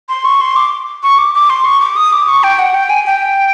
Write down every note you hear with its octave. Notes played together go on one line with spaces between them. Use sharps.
C6
C#6
C6
D6
C#6
D6
D6
C6
C#6
D6
D#6
D6
C#6
G5
F#5
G5
G#5
G5